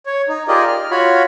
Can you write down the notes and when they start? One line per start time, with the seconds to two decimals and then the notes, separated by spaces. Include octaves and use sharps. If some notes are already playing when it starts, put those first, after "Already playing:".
0.06 C#5
0.29 D#4
0.48 F4 G4 G#4 A#4 D5 D#5
0.68 F6
0.91 F4 F#4 C#5 B5